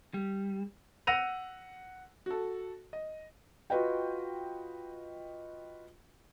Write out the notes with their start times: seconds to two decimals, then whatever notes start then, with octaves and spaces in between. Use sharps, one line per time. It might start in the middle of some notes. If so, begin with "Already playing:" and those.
0.14 G3
1.07 F#5 E6 A#6 D#7 F7
2.26 F#4 A4
2.93 D#5
3.70 F4 F#4 B4 D#5 G5